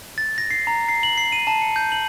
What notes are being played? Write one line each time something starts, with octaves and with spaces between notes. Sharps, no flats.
A6
A#6
C7
A#5
C7
F#7
C7
D#7
A5
C#7
G6
F#7